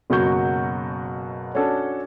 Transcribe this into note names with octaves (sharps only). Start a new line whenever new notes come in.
F#1 B2 F#3 F#4 C#6 G6
C#4 D4 F#4 A4